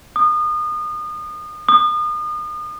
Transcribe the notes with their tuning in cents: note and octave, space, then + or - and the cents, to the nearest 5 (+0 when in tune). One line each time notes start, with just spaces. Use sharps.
D#6 -30
D#6 -35